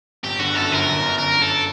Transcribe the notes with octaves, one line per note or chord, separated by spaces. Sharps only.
G1 G4
D3 F#4
F#2 A4
G1 A#4
G1
D3
F#2 A#4
G1
A4